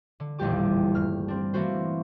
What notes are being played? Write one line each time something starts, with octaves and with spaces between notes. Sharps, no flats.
D3
D#1 A1 E2 G3 G4 D6
G2 F6
C4 D4
E3 A3 A#3 F#4 C5